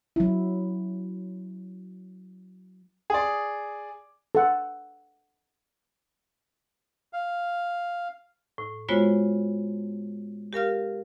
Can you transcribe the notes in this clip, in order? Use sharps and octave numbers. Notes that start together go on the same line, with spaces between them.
F#3 E4
G#4 D5
A4 F#5
F5
A2
G#3 B3 F4 F#4 C5 C#5
G4 A#4 F5 F6